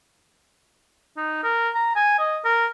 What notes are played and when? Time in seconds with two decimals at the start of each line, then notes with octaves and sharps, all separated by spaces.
1.17 D#4
1.43 A#4
1.75 A#5
1.96 G#5
2.19 D#5
2.45 A#4